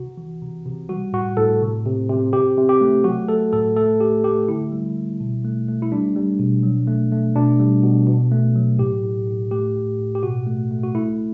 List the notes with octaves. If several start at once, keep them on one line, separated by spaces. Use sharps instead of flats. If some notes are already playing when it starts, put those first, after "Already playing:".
Already playing: C3 F#4
E3
C3
C3
G3 F#4
A2 F#4
A2 A4
C3
C3
C3
C3 G4
C3
G4
A3
F#3 F#4
A3 A4
A2 A4
A3 A4
A3 G4
A3 G4
D3 E4
G3
G3
B2
A3
A3
E4
G3 D4
G3
B2
F#3
A3
A3
B2 D4
G3
B2
B2
A3
F#3
A2 G4
A2
A2
A3 G4
A2
A2
G4
B2 F#4
A3
A3
F#4
A3 E4